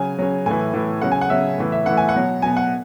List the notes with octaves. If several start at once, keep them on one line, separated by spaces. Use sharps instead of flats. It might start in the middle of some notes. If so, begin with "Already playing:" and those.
Already playing: C#3 F#3 G#5
C#3 F#3
A2 E3 G#5
A2 E3
C#3 F#3 F#5
G#5
F#5
C#3 F#3 E5
A2 E3
E5
A2 E3 F#5
G#5
F#5
B2 F#3
B2 F#3 G#5
F#5